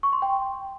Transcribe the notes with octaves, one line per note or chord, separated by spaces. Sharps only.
C#6
C6
G5